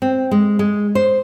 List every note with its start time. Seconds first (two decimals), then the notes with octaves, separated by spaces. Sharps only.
0.02 C4
0.31 G#3
0.59 G#3
0.95 C5